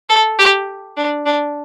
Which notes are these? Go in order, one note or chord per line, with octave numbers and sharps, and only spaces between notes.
A4
G4
D4
D4